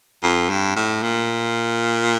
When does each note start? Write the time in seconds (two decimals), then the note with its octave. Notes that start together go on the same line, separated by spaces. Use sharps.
0.23 F2
0.50 G2
0.76 A2
1.02 A#2